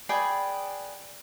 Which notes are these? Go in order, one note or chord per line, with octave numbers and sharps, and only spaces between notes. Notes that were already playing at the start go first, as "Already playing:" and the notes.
G#4 B4 D5 G5